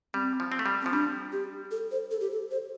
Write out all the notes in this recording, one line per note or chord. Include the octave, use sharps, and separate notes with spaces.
G3 C4
F3
C4
A3
G3
F3 C4
G3 D4
G4
A4
C5
A4
G4
A4
C5